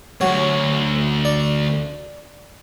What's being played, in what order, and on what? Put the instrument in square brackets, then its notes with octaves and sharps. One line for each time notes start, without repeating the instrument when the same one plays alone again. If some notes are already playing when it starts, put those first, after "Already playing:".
[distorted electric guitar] D2 [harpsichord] F#3 C#5
[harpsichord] D5